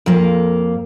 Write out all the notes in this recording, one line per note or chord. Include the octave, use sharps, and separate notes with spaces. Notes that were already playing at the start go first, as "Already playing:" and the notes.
F2 A#3